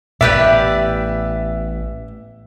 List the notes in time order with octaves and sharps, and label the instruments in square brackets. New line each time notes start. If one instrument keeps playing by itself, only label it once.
[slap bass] A1 A2 B3 [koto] G4 B4 D5 [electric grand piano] E5